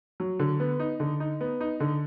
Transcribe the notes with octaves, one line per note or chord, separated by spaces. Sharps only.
F#3
D3
B3
D#4
D3
D#4
B3
D#4
D3